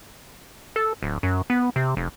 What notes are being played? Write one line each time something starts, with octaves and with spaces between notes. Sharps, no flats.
A4
D1
F#2
B3
C3
F1